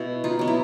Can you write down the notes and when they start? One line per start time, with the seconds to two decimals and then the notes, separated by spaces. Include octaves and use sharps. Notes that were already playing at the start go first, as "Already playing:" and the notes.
Already playing: B2 E4 F#4
0.24 D#4 F4
0.39 F#3 B3
0.47 E4